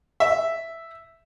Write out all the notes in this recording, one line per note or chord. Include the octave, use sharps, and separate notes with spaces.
E5